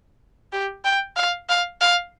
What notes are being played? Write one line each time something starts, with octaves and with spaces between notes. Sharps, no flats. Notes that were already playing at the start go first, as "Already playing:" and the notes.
G4
G5
F5
F5
F5